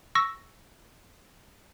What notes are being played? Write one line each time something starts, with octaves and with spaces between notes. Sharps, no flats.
C#6 E6 A#6